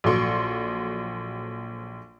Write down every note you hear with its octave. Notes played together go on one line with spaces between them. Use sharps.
A#1 F#3 A4 C6 C#6 D7